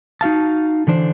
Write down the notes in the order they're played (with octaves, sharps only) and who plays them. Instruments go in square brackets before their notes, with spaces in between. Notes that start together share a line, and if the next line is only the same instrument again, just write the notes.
[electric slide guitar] D#4 F#4 F5 A5
D3 E3 D4 C5